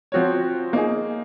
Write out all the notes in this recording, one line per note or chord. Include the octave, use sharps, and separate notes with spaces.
F3 C4 F#4 C#5
A#3 D#4 G#4